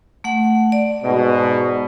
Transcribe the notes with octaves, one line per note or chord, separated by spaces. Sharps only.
A3 F#5
D5
G#2 B2